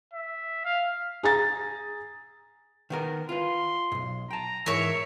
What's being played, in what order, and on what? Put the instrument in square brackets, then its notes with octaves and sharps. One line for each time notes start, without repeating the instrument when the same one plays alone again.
[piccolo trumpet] E5
F5
[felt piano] G#4 A#5 A6
[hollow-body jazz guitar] D#3 B3 A#4
[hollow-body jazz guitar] F4 B4 [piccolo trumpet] C6
[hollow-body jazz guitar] B1 G#2
[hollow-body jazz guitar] G5 A5 [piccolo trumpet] A#5
[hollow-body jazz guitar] G#2 E3 [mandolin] A#4 C#5 [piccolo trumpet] E5